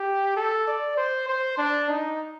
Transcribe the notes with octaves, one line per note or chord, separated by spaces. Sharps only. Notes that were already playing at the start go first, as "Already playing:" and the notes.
Already playing: G4
A4
D5
C5
C5
D4
D#4